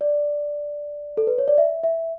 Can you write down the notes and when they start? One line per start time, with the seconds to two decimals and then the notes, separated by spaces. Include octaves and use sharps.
0.01 D5
1.17 A4
1.27 B4
1.38 C#5
1.48 D5
1.58 E5
1.84 E5